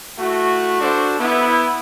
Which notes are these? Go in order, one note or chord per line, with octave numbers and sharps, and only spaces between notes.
A3 E4 F#4
D4 F#4 A4 C5
B3 E4